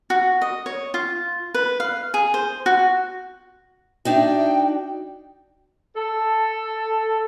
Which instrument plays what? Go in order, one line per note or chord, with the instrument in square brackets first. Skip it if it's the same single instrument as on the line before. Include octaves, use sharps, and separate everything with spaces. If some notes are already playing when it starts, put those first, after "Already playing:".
[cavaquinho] F#4
D#5
C#5
F4
B4
F5
G#4
C5
F#4
[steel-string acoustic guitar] D4 D#4 F#4 [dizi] G5
[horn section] A4